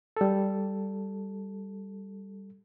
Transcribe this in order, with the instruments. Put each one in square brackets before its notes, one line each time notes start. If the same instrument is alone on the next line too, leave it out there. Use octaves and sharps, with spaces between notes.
[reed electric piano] G3 A4